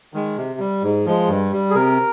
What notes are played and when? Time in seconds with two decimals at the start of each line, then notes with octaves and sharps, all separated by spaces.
0.14 D#3 G#3
0.37 C3
0.60 G3
0.83 G#2
1.06 F3 G#3
1.29 G2
1.52 G3
1.70 G#4
1.75 C3 A#4